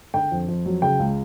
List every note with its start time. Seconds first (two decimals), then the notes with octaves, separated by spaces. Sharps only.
0.14 D3 G5
0.32 F2
0.48 F2
0.66 F#3
0.82 C#3 G5
0.99 C#2